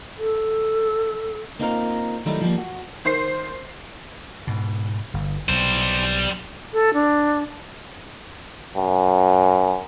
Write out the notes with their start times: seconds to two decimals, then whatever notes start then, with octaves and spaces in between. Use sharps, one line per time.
0.17 A4
1.59 A#3 C4 D#4 F4 A#4
2.26 D#3 F#3 G3 A3 D#4 E4
2.41 F3 G3 A#3
2.58 F#4
3.05 D#3 C5 C7
4.47 G#2 B2
5.14 G1
5.49 B1 G3 C5
6.73 A4
6.94 D4
8.77 F#2